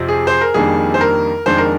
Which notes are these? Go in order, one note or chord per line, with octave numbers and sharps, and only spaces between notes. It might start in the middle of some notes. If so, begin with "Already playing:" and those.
Already playing: F2 C3 F3 C4
G#4
C5
A#4
F2 D#3 G3 A#3 D4 G#4
C5
A#4
F2 D#3 G#3 D4 C5
A#4